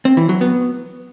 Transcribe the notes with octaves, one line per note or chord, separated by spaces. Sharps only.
C4
E3
F#3
B3